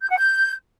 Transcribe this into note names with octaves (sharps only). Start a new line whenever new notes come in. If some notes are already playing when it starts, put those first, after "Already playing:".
G6
F#5
G6